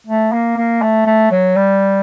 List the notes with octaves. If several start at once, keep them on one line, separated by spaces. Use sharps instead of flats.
A3
A#3
A#3
A3
A3
F#3
G3